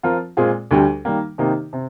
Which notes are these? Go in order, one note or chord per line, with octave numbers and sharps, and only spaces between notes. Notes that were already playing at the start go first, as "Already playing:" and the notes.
F3 C4 F4 A#4
A#2 G#3 C4 F4 G#4
D2 D3 G3 D4 G4
D#3 G3 A#3
C3 D#3 A#3 D#4 G4
C3